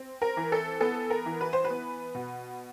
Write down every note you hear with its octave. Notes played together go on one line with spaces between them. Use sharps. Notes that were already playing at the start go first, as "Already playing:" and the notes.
Already playing: C4
A#4
E3
A4
B3 A4
A#4
E3
B4
C5
B4
B3
B2